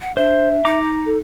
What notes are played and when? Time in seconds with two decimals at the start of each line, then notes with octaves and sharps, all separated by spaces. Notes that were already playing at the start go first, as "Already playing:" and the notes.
0.01 F#5
0.17 D4 C5 E5
0.65 D#4 A#5 D6
1.06 A4